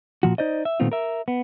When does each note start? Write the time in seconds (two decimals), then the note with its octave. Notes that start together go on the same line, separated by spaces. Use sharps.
0.23 A#2 F3 F#4
0.38 D#4 C5 D5 D#5
0.65 E5
0.80 A#2 D#3 A3 B3 C4 F4
0.92 A#4 E5
1.28 B3